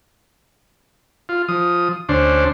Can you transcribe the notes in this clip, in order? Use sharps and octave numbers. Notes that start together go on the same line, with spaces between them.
F4
F3 D#6
D2 C#4 D4 C5